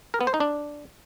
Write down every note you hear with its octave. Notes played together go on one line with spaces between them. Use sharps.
A#4
B3
C5
D#4
D4